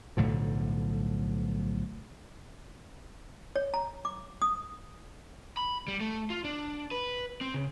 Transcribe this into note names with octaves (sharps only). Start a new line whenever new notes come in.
B1 A2 D3 F3
C#5
A#5
D6
D#6
B5
G3
A3
F4
D4
B4
C4
C#3